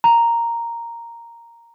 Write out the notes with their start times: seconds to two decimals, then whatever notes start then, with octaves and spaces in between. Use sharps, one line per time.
0.04 A#5